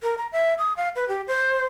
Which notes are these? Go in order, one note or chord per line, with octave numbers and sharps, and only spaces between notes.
A#4
A#5
E5
D#6
F5
B4
G4
C5